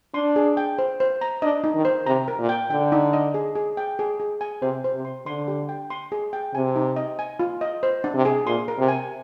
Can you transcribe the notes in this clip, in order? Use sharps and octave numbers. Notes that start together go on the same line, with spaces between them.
D4 C6
G#4
G5
C5
C5
A#5
D4 D#5
D#4
D#3
C5
C3 A#5
A#4
A#2
G5
D3 G5
D#4
D#5
G#4
G#4
G5
G#4
G#4
G#5
C3 C5
C5
C3
C6
D3 C6
G4
G5
C6
G#4
G5
C3 G#5
D#4
D#5
G#5
F4
D#5
C5
D4
C3
G#4
A#2 C6
A#4
C3
G#5